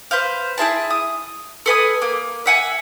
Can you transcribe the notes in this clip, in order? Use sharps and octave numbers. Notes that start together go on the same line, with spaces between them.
B4 C5 F5
E4 G#4 E5 A5
D#6
A4 B4 G#5 D#6
A#3
E5 F#5 G#5